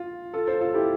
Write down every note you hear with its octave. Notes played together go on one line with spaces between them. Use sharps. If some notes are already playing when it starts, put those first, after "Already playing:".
Already playing: F4
F4 A4
A4 C5
F4 A4
E4 G4